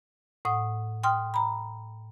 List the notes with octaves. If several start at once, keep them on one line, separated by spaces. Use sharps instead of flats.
A2 F#5 D#6
G5 C6 D#6 F6
A#5 B5